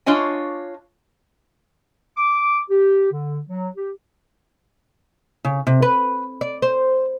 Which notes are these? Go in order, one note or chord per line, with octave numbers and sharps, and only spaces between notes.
D4 F4 C#5 D#5 G#5
D6
G4
D3
F#3
G4
C#3
C3
B4
D5
C5